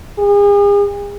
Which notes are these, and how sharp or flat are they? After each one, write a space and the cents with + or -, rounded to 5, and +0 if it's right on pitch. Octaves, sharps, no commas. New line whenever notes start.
G#4 -40